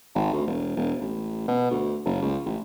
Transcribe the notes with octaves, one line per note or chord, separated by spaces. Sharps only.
G#1
D2
E1
E1
A1
B2
D2
F#1
C#2
A1